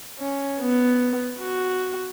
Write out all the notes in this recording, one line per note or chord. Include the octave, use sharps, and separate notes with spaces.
C#4
B3
F#4